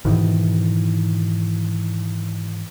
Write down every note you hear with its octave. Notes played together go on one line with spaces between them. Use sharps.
G#2 B2 D#3 E3